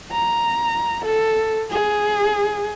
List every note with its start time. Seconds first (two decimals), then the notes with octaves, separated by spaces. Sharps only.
0.12 A#5
1.05 A4
1.70 G#4